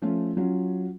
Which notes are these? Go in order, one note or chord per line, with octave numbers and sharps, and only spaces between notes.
F3 A3 C#4 F4
F#3 C#4 F4